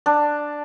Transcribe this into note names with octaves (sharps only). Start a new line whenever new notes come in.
D4